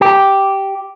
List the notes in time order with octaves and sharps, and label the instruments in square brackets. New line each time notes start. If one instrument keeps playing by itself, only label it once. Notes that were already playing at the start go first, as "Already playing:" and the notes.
[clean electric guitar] G4